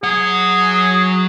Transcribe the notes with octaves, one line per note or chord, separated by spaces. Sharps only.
F#3 G#4 F#5